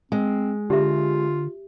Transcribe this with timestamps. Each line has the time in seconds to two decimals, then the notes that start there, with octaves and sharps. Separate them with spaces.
0.12 G#3 C4
0.70 D3 F4 G4 E5